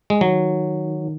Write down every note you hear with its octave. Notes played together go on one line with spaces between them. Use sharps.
G#3
D#3 F#3